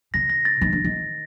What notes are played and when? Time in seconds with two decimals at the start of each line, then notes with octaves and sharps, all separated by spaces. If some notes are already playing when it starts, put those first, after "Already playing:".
0.14 C#3 A#6
0.30 A#6
0.45 A6
0.61 D#3
0.73 D3
0.84 D#3